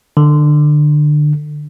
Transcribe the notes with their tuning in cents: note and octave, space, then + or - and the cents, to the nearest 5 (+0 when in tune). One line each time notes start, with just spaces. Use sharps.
D3 +25